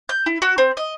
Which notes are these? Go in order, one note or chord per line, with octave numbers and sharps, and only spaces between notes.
G6
E4
F#4
C4
D#5